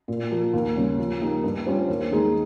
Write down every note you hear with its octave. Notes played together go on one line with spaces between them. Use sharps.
A#2
F3 A#3
D#2
C#3 G3 C#4
F3
A#3 D#4 G4
G2
G3 C#4 F4 C5
D#2
D#3 G#3 D#4 G#4